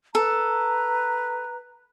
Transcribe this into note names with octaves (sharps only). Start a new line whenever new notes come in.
A4 B4 A#5